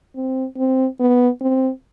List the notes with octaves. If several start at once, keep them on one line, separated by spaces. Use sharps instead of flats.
C4
C4
B3
C4